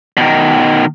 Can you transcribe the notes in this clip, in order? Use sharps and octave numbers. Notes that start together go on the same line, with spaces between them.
B2 D#3